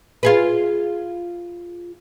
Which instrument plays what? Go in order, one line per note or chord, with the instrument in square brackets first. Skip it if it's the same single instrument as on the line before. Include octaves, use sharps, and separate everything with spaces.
[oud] F4 G#4 B4